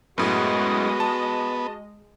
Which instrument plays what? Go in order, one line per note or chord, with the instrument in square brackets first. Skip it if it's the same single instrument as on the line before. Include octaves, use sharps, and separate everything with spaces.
[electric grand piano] F#2 A2 [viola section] G#3 D#5 [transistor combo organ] B3 [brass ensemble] F#4
[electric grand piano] A5